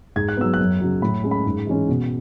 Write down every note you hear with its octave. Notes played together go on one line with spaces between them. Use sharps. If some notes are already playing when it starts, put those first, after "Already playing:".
G#2 G#6
F#6
F#3 B3 E6
F#6
F#2
C#3 F#3
A2 B5
G#3 C#4
B5
G#2
E3 G#3 C#4
B2